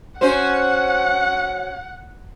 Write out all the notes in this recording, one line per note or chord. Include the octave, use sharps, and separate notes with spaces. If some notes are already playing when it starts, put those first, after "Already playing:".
C#4 F#4 C5 F#5